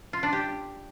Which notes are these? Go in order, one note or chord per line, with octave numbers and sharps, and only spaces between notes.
F4
D4
G4